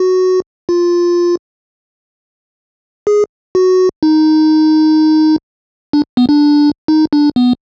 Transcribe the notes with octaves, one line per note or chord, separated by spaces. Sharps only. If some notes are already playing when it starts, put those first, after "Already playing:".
Already playing: F#4
F4
G#4
F#4
D#4
D4
B3
D4
D#4
D4
B3